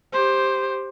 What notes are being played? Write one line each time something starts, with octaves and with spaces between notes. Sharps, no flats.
G4 C5